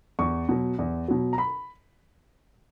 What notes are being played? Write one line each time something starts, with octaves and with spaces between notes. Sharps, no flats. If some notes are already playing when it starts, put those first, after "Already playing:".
E2 C#6
B2 F#3
E2
B2 F#3
A#5
B5